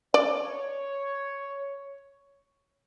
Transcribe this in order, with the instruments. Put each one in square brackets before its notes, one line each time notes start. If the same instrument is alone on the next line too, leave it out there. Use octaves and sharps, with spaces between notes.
[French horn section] C#5 [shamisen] D5